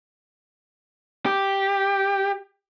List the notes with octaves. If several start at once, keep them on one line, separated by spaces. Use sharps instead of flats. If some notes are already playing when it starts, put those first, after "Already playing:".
G4